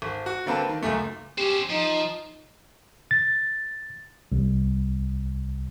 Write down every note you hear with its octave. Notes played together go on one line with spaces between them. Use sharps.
G#1
F#4
D3 A#3 C4 B4 A5
D#3
C#2 F#2 A3
C#4 G4 C5
F3 D#4
A6
C2